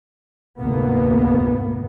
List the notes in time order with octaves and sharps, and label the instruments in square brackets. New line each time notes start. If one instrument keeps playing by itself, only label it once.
[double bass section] F1 D2 G#2 A#3 B3